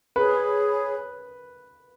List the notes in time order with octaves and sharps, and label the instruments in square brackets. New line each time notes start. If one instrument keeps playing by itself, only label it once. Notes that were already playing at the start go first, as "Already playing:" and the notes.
[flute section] G#4 C#5 B5 [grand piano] B4